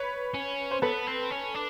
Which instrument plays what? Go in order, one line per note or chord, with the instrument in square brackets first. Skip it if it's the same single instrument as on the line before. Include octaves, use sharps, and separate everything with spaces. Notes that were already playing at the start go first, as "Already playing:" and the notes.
Already playing: [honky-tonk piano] B4 C#5
[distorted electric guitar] C#4
[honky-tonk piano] C5
[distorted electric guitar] B3 [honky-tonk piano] A4 B4
[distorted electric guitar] C4
C#4
D4